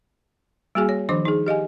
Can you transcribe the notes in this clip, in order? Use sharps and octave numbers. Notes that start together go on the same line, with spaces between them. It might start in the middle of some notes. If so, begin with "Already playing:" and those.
G3 A#3 F#4 G#4 G#5
C#5
D#3 F3 D4 C5 D6
D#4 G#4
G4 D#5 F5 G#5